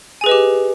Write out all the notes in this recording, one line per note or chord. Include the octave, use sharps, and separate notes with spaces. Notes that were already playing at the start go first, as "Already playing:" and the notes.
G4 G#4 B4 D#5 G#5